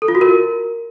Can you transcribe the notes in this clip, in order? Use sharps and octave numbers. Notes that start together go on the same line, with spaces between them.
A4
F4
F#4
A#4